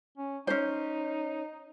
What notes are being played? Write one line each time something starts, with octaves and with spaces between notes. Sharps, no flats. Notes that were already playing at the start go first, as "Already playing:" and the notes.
C#4
C#4 D#4 C5